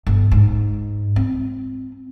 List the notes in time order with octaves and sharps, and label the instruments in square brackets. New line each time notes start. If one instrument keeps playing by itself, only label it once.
[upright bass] G1
G#2
C4